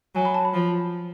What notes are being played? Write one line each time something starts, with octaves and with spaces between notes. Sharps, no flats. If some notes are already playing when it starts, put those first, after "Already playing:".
F#3 G#5
B5
A5
B5
F3